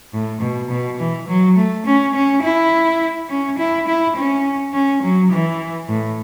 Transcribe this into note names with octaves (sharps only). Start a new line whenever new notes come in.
A2
B2
B2
E3
F#3
A3
C#4
C#4
E4
C#4
E4
E4
C#4
C#4
F#3
E3
A2